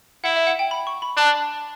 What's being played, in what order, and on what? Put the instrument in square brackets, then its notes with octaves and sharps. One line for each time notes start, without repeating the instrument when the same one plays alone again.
[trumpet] E4 [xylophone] F#5
[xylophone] E5
F#5
G5
B5
C#6
B5
[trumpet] D4 [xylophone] A5